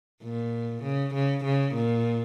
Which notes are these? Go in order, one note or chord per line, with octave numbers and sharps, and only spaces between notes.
A#2
C#3
C#3
C#3
A#2